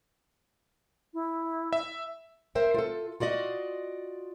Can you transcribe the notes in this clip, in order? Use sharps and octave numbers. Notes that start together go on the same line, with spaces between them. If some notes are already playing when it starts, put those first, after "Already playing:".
E4
E5
A#4 C5 E5 G5
F4 A4
F4 F#4 D5 D#5